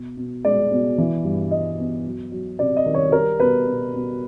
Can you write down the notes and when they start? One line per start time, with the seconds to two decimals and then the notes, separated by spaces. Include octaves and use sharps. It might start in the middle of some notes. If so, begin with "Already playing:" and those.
Already playing: B2
0.17 B2
0.44 G#3 D5
0.71 B2
0.98 E3
1.24 G2
1.51 G3 D#5
1.79 B3
2.05 F#3
2.32 F#3
2.59 C3 D5
2.76 D#5
2.86 D#3
2.94 C#5
3.12 G3 A#4
3.40 B2 B4
3.67 B2
3.94 B2